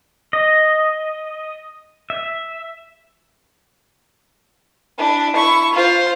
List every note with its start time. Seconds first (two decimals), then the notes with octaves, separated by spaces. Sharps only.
0.33 D#5
2.10 E5
4.98 D4 E4
5.35 E4 C#6
5.73 F4 C5